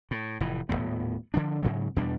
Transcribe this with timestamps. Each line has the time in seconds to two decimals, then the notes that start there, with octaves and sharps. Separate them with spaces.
0.11 A2
0.40 F1 A2 E3
0.69 D#1 E2 A2 B3
1.34 D3 F3 D4
1.63 G#2 C#3 F#3
1.96 E2 B2 G3 D4